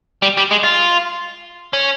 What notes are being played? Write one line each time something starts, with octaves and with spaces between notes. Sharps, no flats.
G3
G3
G#3
F4
C#4